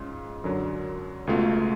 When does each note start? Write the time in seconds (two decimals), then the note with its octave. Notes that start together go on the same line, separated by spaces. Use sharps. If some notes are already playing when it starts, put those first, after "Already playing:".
Already playing: G#2 G#3 C#4 F4
0.44 F#2 D3 F#3
1.27 C#2 B2 A3 F4